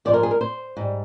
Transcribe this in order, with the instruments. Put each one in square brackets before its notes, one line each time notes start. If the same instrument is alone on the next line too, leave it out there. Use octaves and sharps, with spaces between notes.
[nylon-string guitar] G#2 F3 G#3 D5
A#4
G#4
A#4
C5
G#2 G3